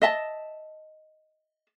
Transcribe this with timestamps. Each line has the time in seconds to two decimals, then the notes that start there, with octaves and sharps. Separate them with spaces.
0.02 D#5 E5 A5